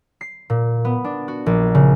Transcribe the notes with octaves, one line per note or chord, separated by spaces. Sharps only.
C7
A#2
B3
D4
F#4
A#1
C#3